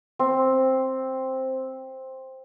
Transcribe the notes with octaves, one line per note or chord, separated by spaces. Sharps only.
C4